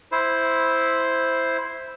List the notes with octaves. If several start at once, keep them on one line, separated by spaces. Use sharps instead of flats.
E4 C5